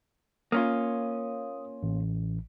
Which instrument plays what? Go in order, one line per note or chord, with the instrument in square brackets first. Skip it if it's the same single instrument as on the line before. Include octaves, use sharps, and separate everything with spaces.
[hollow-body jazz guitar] A#3 C#4 F4 [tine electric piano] D#6
[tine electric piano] A1